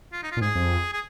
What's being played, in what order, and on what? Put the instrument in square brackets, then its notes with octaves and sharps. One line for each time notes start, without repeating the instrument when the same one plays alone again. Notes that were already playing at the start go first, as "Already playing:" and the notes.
[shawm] F4
D#4
F4
[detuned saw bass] A#2
[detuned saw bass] G#2 [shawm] G#4
[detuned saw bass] F2
[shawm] G#4